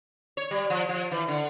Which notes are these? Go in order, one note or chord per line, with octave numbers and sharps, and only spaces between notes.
C#5
G3
F3
F3
E3
D3